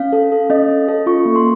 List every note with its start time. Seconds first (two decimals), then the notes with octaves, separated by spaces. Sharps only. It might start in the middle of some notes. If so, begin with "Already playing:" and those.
Already playing: C#4 F5
0.13 A4
0.32 A4
0.50 C#4 D#5
0.69 C#4
0.88 A4
1.06 F4 C#6
1.25 A#3
1.36 C6